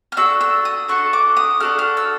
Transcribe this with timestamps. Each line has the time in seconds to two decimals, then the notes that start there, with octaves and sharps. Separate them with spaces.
0.12 F6
0.17 D4 F#4 A4 E6
0.41 E6
0.65 D#6
0.88 D4 F#4 A4 C#6
1.13 D6
1.37 D#6
1.60 D4 F#4 A4 F6
1.79 F6
1.97 E6